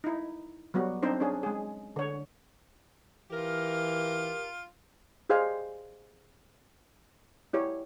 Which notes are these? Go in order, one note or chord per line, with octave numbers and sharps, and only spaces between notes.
D#4 E4
F#3 G3 B3 F#4
C4 D4 D#4 C5
C#4 D4 G#4
G#3 G#4
D3 C#5
E3 F4 G4 A#4
G4 G#4 C5 D#5 F5 G#5
E4 G4 C#5